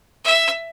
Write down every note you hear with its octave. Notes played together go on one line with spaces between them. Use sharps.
E5